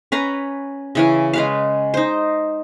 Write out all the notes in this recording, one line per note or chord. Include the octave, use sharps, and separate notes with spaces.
C#4 B4 A#5
C#3 E3 C#4
G#3 B4 F5
D#4 C5